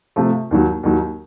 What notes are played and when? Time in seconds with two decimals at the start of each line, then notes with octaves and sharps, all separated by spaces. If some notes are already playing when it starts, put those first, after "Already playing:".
0.16 C3 F3 A3
0.51 D#2 D#3 F#3
0.83 D#2 D#3 F#3